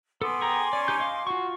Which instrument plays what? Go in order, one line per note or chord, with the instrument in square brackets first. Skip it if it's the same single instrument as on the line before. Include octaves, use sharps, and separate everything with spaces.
[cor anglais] B3 [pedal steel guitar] A4 [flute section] G#5 C6 D6
[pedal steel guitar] G#4 G5 A#5
[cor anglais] C#4 [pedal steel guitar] D5
[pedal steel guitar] D#4 G4 G6
D#5 F5
[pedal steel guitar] F4 C#6 [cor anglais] F#4